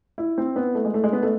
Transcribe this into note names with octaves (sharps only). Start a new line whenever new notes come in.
E4
C4
B3
A3
G#3
A3
G#3
B3
A3